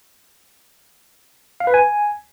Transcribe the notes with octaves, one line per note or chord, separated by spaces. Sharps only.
F5
B4
G#5